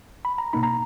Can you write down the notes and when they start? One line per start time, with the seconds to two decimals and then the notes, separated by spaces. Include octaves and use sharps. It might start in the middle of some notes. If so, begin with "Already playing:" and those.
0.25 B5
0.38 A#5
0.53 B2 A#3 D#4 B5
0.63 A#5